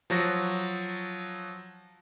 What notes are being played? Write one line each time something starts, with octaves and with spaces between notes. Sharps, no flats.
F3 F#3 F#4 A#6